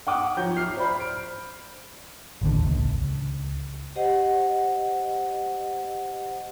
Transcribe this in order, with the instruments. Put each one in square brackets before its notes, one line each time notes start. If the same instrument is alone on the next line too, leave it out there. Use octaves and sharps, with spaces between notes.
[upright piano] F#5 G5 D6 D#6
F3 C#5 A#5 G6
F6 C7
C5 D5 B5
D7
[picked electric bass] A1 D#2 D3
C#2
[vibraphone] G4 C5 D#5 F#5